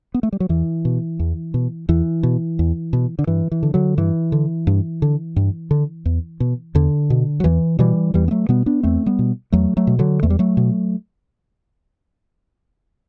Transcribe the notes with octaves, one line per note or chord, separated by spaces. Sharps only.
B3
A3
G3
F#3
E2 E3
B2
E2
B2
E2 E3
B2
E2
B2
D3
G2 E3
E3
D3
D3 F#3
G2 E3
D3
G2
D3
G2
D3
E2
B2
E2 D3
B2
F#3
E2 E3
B2 E3 G3
E2 E3 G3
B3
F#3 A3
B2 G3 B3
B3 D4
E2 A3 C4
G3 B3
B2
E2 F#3 A3
F#3 A3
B2
D3 F#3
E2 A3
G3
F#3 A3
B2